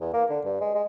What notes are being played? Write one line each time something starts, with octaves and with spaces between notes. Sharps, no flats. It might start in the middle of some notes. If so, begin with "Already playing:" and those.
E2
A#3
D3
G2
G#3
G#3